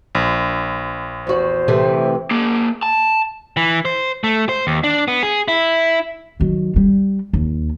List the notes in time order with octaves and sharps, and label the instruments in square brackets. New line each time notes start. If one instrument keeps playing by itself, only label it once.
[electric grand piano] A#1
[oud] E2 F#4 [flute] C5
[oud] C3 E3 A3
[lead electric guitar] A#3 G#4
A5
[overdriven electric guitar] E3
C5
A3
C5
D#2
D4
B3
G#4
E4
[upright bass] D#3 F#3
G3
D#2